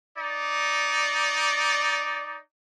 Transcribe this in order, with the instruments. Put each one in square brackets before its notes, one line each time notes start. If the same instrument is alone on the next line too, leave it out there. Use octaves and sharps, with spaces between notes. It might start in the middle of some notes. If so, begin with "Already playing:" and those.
[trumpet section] D#4 D5